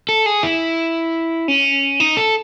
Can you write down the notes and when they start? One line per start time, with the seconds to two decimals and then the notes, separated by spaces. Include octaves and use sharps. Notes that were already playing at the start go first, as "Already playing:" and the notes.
0.09 A4
0.26 G#4
0.43 E4
1.48 C#4
2.00 D#4
2.17 A4